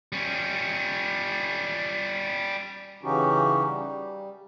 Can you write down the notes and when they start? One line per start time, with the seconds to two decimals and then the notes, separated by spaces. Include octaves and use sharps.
0.13 G3 C#4
3.03 C#3 E3 C#4 D#4 F#4 G4
3.67 G3